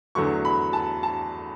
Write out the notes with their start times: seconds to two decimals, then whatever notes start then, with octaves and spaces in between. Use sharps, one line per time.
0.15 E2 D3 F#3 A3 C#6
0.45 B5
0.73 A5
1.03 A5